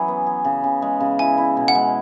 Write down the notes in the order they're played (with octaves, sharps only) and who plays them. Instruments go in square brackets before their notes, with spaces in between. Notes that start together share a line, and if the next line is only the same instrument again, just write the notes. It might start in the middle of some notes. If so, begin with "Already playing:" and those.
Already playing: [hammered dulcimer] E3 F#3 C#4 G#4 [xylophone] B5
[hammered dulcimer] B3
G#4
C#3
C#3
G#3
C#3
[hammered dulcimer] E4 [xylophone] G#5
[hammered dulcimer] E4
B2
[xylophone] F#5
[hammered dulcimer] G#3